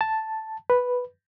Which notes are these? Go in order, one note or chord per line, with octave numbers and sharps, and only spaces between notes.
A5
B4